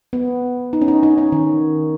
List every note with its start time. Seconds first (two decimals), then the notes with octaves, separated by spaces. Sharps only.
0.13 B3
0.73 D#4
0.82 C#4
0.88 D#4
1.03 D#4
1.18 C#4
1.32 D#3